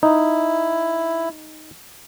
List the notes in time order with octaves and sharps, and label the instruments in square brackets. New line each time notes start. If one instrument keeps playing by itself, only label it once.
[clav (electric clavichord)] D#4 [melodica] E4